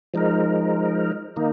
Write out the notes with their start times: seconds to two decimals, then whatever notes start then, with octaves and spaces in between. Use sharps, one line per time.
0.14 F3 G#3 D#4 A#4
1.36 D#3 A#3 D#4